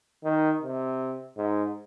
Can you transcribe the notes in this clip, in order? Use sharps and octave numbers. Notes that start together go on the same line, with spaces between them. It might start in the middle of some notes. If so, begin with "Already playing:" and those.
D#3
C3
G#2